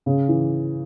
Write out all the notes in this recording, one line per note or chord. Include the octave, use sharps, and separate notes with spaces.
C#3
E3